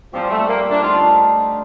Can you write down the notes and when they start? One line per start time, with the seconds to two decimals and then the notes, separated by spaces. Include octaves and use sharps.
0.13 A#2 F3 G3 C4 G4
0.30 A3
0.48 A#3
0.70 D4
0.81 D3 A3 D#4 F4 G4